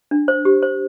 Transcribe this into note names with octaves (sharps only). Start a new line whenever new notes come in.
D4
C5
G4
C5